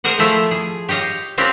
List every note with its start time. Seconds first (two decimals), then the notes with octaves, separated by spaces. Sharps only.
0.04 G#4 A#4 C5 D#5 F#5
0.19 F3 A3 E4 F4
0.51 G#4
0.89 G4 C#5 D#5 F5
1.38 C4 C#4 F4 G4 A#4 B4